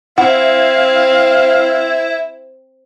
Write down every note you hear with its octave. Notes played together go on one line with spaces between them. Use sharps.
C4 E4 F5 F#5